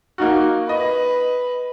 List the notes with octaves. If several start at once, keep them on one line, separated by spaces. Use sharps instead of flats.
A#3 D#4 F#4
B4 D#5